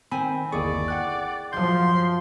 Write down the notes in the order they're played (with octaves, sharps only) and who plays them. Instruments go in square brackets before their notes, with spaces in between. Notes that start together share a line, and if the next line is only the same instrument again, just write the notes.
[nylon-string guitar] D#3 C4 G#5 [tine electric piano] B5
[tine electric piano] G1 D#2 C#6 [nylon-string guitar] E4 G#4 [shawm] D5
[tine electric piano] F#5 G5 F#6
[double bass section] F#2 F3 [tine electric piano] F5 G6 [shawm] C6